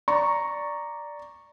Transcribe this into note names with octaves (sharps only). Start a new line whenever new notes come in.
D5 A#5 C#6